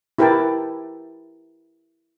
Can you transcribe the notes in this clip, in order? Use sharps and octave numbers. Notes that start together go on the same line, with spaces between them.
E4 G4 A#4 B4 G5 A5